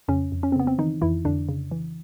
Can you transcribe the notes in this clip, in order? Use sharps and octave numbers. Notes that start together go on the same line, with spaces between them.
F2 C#3 C#4
F2
C#4
C4
C#3 B3
C4
D#3 E3 D#4
F2 E3 E4
F2 D3 D4
C#3
E3